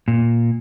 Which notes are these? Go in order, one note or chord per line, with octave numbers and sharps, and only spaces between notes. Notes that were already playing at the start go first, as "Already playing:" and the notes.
A#2